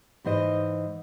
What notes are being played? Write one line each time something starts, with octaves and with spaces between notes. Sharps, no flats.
G#2 E3 C5 D#5